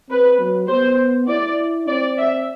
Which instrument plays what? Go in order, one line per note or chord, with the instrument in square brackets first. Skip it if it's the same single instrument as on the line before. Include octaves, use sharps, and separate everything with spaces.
[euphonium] C4 [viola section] B4
[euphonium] F#3
[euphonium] B3 [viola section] C5
[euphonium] E4 [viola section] D5
[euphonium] C4 [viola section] D5
[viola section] E5